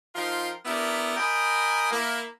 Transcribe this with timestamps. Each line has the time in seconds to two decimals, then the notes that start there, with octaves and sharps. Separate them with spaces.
0.15 F3 D#4 F4 A#4 G5 C6
0.65 B3 D4 E4 G4 A#4
1.16 A#4 D#5 G5 G#5 A#5 B5
1.91 A#3 E4